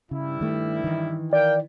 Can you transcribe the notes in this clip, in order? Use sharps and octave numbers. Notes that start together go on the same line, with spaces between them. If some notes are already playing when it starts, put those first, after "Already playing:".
G2 C#3 G3 E4
D#3 A3
D#3 E3
A#4 D5 F5 G5